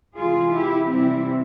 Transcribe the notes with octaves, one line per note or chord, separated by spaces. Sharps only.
C3 E3 G#3 F4 G#4
E4 G4
C3 E3 G3 C4 E4